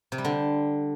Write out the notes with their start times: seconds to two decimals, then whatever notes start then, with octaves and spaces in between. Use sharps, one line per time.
0.12 C3
0.18 G3
0.25 D3